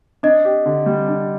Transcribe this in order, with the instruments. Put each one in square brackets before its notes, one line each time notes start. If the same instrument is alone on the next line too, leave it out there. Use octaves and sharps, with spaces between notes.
[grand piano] D4 [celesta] D#5
[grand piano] G4
D3
G3
D4